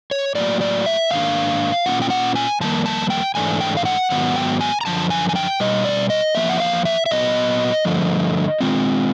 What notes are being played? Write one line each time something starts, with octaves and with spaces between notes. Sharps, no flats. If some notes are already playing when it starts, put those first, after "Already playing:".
C#5
A2 F#3 A#3 D5
D5
E5
G#2 D#3 A#3 D4 F5
A#2 G3 A#3 C#4 F4 F#5
G5
F#5
G#5
F2 C3 D#3 G3 A#3 A5
A5
G5
G#2 E3 A3 D4 G#5
G5
F5
F#5
G#2 D#3 F#3 B3 F#5
G5
G#5
A#5
F#2 D3 F3 A5
G#5
G#5
G5
B2 G3 D#5
D5
D#5
E2 C#3 F3 A#3 E5
F#5
F5
E5
E5
A#2 F#3 B3 D#5
G2 D3 F3 A3
D#3 G#3 C4 F4